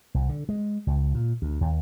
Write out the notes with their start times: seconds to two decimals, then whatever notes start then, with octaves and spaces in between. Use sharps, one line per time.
0.14 C2
0.29 D3
0.49 G#3
0.87 C#2
1.15 A#2
1.42 D2
1.61 D#2